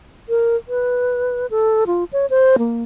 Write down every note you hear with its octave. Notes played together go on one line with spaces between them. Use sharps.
A#4
B4
A4
F4
C#5
C5
A#3